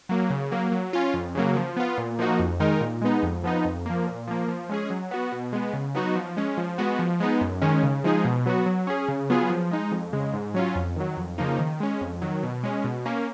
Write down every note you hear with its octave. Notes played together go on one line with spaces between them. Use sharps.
F#3 A#3
C#3
F#3 A#3
F#3
C#4 F4
F2
C#3 F#3 A#3
F3
B3 F4
A#2
F3 A#3 D#4 F#4
F2
D#3 G#3 D#4 A#4
A#2
G#3 B3 D#4
F2
F3 B3 D#4
F2
F3 A#3
A#2
F3 A#3
F3
G#3 C#4 G#4
F#3
B3 F#4
B2
G#3 B3
C#3
F#3 B3 D#4 F#4
F3
G#3 C#4
F3
G#3 B3 F#4
F3
G#3 B3 D#4
F#2
D#3 G#3 C#4
C#3
F3 G#3 D#4 G#4
B2
F#3 B3 F#4
F#3
C#4 G#4
C#3
F#3 B3 F4 G#4
F3
G#3 D#4
F2
C#3 G#3
G#2
F#3 C#4 F4
F2
D#3 F#3
F2
C#3 F3 A#3 D#4
D#3
G#3 C#4
F2
D#3 F#3
B2
G#3 C#4
B2
A#3 C#4